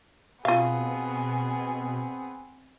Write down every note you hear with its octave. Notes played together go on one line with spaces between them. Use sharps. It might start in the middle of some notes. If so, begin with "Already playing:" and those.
B2 B3 C4 F4 G#4 F5